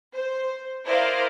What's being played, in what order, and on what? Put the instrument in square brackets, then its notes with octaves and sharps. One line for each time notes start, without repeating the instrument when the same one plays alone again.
[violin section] C5
E4 A#4 C5 D5 D#5 F5